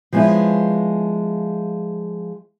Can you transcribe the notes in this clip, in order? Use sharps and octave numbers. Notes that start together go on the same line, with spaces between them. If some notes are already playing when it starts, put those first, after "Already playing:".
F3 G#3 B3 C#4 E4